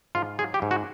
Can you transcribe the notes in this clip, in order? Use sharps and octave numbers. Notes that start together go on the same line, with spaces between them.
G#2 F4
F#3 G#4
G4
G#2
F#4